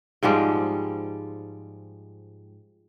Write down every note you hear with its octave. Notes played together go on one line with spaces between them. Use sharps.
G#2 F3 G3 G#3